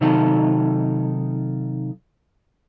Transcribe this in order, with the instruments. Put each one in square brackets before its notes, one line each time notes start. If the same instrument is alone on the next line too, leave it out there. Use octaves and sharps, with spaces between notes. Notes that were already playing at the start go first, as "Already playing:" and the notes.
[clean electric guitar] C3 D#3 F#3 D#4 F4 A4